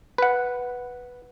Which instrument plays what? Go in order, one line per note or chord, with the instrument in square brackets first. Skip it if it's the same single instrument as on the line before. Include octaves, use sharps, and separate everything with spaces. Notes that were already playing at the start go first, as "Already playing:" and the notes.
[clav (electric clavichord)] B4 F#5